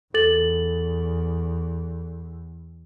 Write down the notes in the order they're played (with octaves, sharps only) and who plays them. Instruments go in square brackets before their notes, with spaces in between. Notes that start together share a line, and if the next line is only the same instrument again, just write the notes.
[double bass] E2 [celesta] A4 A6 F#7